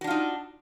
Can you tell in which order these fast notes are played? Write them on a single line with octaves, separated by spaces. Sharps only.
F#4 D4 F4 D#4